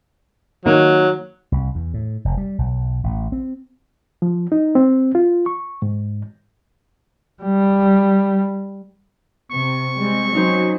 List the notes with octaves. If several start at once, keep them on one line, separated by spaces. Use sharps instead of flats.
D#3 F#3 A#3 D#4
C2
E2
A2
F1
G3
B1
A1
C4
F3
D#4
C4
F4
C#6
G#2
G3
C3 C#6
G3 G#3 C4
F#3 C#4 D#4 C5